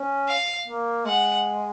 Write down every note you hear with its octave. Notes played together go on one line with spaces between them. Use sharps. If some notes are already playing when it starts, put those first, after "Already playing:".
Already playing: C#4
F5
A#3
G#3 F#5